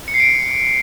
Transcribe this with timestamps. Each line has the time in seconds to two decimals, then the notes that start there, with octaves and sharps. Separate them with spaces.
0.08 C#7
0.14 C7
0.20 D7